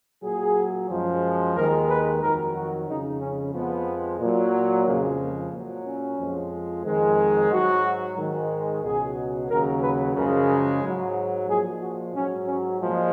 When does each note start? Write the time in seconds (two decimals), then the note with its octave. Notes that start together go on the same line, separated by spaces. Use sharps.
0.23 A#2 F#3 G#4
0.90 F#2 F3 G#3
1.56 D#2 D#3 G#3 A#4
1.89 B4
2.22 F2 D#3 F#3 A#4
2.55 F#4
2.88 F2 C#3 G#3 D#4
3.21 C#4
3.54 F2 F3 G#3 B3
4.20 A#2 F#3
4.86 F2 C#3 F3 G#3 A#3
5.19 A#3
5.52 A#2 F#3
5.86 C#4
6.19 F2 F3 G#3
6.85 F2 D#3 G#3
7.51 G#2 F#3 F#4
8.17 G#2 D#3 G#3
8.83 C#2 B2 F#3 G#4
9.50 D#2 C#3 F#3 A#4
9.82 B4
10.15 F#2 C#3 F3 G#3 A#4
10.82 G#2 F#3
11.48 A#2 F3 G#3 G#4
11.81 F#4
12.14 G#2 F#3 C#4
12.47 C#4
12.80 A#2 F3 G#3